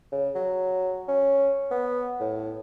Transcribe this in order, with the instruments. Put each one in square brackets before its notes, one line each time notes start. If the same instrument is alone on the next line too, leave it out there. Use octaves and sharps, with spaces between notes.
[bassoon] C#3
F#3
C#4
B3
A2